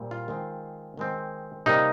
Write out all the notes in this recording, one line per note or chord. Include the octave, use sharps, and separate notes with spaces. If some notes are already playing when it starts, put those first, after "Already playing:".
Already playing: A#2 G3 C4
F4
D#3 G#3 C4
D#3 G#3 C4
C3 G3 A#3 D#4